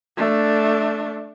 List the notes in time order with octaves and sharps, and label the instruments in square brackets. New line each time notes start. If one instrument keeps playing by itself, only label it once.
[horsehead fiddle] A3 D4